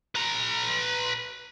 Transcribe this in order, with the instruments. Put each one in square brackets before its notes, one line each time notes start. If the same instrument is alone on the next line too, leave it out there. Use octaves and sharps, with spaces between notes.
[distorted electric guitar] B4 A#5